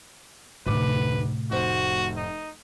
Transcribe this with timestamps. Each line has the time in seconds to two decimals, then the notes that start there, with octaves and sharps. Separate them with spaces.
0.66 F1 D2 A2 C3 B4 D6
1.51 F1 F#4 C5
2.17 D#4